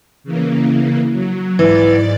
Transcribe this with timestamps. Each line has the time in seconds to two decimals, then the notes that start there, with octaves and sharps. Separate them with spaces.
0.24 C#3 E3 A#3
1.10 F#3
1.59 G#2 E3 D5 A6